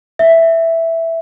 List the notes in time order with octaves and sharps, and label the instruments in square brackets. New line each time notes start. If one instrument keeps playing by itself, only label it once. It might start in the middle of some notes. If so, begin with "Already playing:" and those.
[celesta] E5